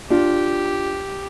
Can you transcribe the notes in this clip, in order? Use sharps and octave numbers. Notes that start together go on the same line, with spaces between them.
D4 F4 G4